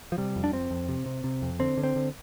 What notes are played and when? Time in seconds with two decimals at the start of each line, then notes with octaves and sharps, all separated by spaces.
0.12 F3
0.18 C3 G3
0.36 F2
0.44 D4
0.52 F2 C4
0.71 F2
0.88 C3
1.06 C3
1.24 C3
1.42 F2
1.59 D3 C4
1.77 D3
1.84 C4
1.96 D3